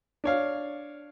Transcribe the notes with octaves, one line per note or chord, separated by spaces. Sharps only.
D4 C#5 F5